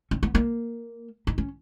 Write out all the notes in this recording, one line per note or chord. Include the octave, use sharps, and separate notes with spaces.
C#4
B3
A#3
D#4
C#4